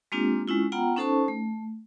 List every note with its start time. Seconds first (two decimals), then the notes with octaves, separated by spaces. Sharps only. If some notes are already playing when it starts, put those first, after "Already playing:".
0.12 G#3 A#3 C4 D4 F4 G4
0.48 G#3 C#4 E4 F4
0.72 B3 F4 F#5 G5 A#5
0.97 C#4 D#4 A4 C5 A5 C#6
1.28 A3